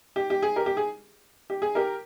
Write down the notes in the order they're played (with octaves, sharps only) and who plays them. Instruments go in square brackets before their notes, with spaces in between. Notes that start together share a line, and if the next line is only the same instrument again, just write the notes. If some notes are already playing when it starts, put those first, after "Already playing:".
[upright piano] G4
G4
G#4
G4 A#4
G4
G#4
G4
G#4
G4 A#4